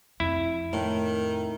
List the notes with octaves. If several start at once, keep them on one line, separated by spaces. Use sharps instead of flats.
F2 C4 E4
A2 D#3